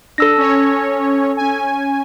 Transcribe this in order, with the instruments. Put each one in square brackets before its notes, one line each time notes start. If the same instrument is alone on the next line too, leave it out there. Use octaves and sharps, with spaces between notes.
[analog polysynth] D4 [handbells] A4 E6 A#6
[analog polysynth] C#4 C#5
C#4 G#5